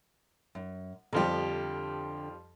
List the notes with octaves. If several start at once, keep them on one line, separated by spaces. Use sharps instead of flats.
F#2
F2 D3 F3 G3 G4